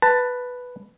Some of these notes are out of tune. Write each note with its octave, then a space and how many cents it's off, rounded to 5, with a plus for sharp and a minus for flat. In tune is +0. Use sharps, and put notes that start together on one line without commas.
B4 +0 A5 +15